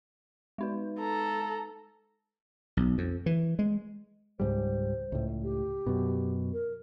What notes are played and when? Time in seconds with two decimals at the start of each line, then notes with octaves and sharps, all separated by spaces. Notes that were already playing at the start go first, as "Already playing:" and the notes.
0.58 G#3 D#4 B4
0.99 A4 A#5
2.77 B1
2.98 F2
3.26 E3
3.59 G#3
4.40 C#2 G#2 G3 C5
5.12 C#2 A2
5.44 G4
5.87 F#2 B2
6.53 A#4